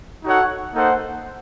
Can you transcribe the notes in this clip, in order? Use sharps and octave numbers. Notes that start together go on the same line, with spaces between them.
D#4 F#4 A4 C#5 F#5
A#3 D#4 A4 C5 F#5